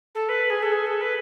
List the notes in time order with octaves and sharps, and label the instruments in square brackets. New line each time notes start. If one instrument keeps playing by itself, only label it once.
[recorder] A4
B4
G#4
A4
G#4
A4
B4